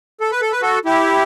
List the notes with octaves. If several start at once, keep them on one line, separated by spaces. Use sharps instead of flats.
A4
B4
A4
B4
F#4 A4
E4 G4